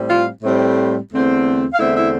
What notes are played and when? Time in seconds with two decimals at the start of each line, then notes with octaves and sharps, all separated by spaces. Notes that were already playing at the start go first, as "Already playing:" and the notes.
Already playing: A2 G3 C4
0.09 F4 F5
0.43 A2 G3 C4
1.11 E2 D3 A3 C4
1.73 F5
1.79 E2 D3 A3 C4 E4 E5
1.95 E4 E5